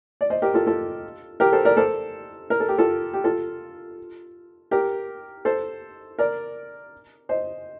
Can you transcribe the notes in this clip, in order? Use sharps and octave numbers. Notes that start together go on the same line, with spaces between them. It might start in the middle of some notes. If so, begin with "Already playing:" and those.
D5
C5 D#5
G4 A#4
F4 A4
F4 A4
G4 A#4
A4 C5
A#4 D5
A4 C5
A#4
A4
G4
F4 A4
G4
F4 A4
G4 A#4
A4 C5
A#4 D5
C5 D#5